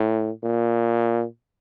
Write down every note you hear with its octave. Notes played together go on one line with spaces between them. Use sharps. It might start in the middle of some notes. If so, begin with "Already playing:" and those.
Already playing: A2
A#2